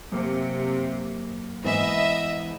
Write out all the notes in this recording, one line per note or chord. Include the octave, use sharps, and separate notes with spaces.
F#2 C3 A#3
G#2 E3 B3 D#5 E5 B5